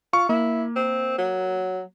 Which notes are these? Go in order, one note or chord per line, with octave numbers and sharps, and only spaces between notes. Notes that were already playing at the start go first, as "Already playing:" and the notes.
F4 C#6
A#3 E4
C4
F#3